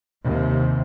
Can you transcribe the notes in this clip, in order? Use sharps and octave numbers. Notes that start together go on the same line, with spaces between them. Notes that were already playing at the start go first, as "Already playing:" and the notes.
D#2 C3